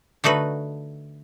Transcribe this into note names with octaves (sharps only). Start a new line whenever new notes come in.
D3 A3 D#4 F#4 B4